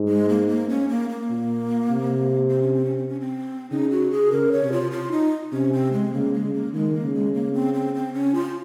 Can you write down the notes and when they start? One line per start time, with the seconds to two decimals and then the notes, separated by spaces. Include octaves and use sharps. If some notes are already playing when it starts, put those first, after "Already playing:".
Already playing: G#2
0.08 G#3
0.29 A#3
0.48 A#3
0.69 C#4
0.89 A#3
1.10 A#3
1.30 A#2
1.90 C3
2.50 C4
2.62 C#4
2.74 C4
2.85 C#4
2.97 C4
3.08 C#4
3.20 C4
3.71 C#3 D#4
3.91 F#4
4.11 G#4
4.32 C#3 A#4
4.52 C#5
4.62 C3
4.72 F4
4.91 F4
5.12 D#4
5.52 C3 C#4
5.73 C4
5.93 G#3
6.13 C#3 A#3
6.33 G#3
6.44 C#3
6.54 A#3
6.73 D#3 G#3
6.94 A#3
7.03 C#3
7.14 G#3
7.34 A#3
7.54 C4
7.74 C4
7.95 C4
8.14 C#4
8.35 F4